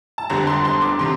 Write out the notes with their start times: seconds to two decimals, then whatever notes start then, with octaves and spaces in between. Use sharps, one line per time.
0.18 A5
0.30 G1 F2 D3 G3 A#5
0.47 C6
0.65 C6
0.82 D6
0.99 C3 D#3 C6